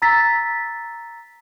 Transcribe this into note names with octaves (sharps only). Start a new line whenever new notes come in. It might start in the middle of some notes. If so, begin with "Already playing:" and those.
A#5 E6 A6 B6